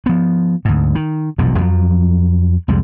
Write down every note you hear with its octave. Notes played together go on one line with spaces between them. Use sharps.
F3 B3
D2 G#2
D#3
E1 B1 F2 A#2
F2 F3 F#3
C2 F2 G3 G#3